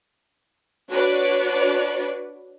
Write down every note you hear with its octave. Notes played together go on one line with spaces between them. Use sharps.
D4 F#4 B4 C#5 D5